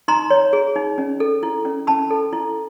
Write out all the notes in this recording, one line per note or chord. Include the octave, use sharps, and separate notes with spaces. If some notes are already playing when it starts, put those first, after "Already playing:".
D#4 A#5 C6
C#5
G#4
D#4
C#4
A4
E4
C#4
C#4 A5 B5
A4
E4